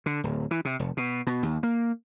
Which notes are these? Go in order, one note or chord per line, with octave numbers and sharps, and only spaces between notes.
D3
D1
E3
C3
F1
B2
B2
D#2
A#3